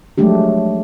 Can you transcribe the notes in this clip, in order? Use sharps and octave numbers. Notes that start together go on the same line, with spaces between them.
F3 F#3 G#3 A3 D4 G4